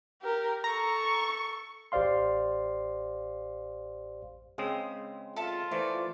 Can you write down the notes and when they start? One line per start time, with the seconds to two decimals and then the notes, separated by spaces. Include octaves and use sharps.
0.22 G4 A#4
0.64 A4 A#5 C#6
1.92 A1 G4 C5 D5 F5 C6
4.58 C#3 G#3 C4 D#6
5.36 F4 A4 E5 A5
5.71 E3 A3 C5 D5